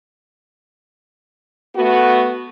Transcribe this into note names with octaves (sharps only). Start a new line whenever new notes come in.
A3 B3 F#4